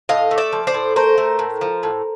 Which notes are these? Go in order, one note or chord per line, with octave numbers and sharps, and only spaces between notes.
A2 D#5 F5
A3
D5 E5
F3
C5 D5
A2
A3 A#4 C5
A3
A2
F3
A2